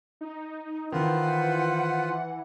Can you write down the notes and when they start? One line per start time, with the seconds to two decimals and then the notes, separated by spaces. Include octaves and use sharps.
0.21 D#4
0.92 D#3 E3 F4 B4 C5 F#5